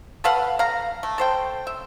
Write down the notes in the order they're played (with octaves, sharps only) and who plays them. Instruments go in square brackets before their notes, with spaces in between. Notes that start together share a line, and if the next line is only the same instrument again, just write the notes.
[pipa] A4 B4 F5 F#5
F5 A#5
A3
A4 C5 G5
E5